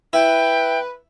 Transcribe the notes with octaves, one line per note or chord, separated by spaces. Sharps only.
E4 B4 G5